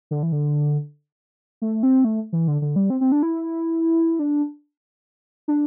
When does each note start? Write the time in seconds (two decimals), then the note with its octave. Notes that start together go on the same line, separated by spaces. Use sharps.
0.11 D3
0.23 E3
0.32 D3
1.62 A3
1.83 C4
2.04 A3
2.33 E3
2.48 D3
2.62 D3
2.76 G3
2.90 C4
3.01 C4
3.12 D4
3.23 E4
4.19 D4
5.48 D4